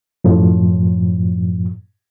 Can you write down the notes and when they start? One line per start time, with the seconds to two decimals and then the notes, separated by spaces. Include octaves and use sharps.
0.24 F#2 A2 F3